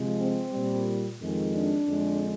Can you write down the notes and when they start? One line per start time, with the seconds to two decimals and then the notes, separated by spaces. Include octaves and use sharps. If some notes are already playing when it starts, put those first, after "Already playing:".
Already playing: C3 F3 G#3
0.20 C4
0.53 A#2 G3
1.20 F2 D#3 G#3
1.54 D4
1.88 F2 D3 G#3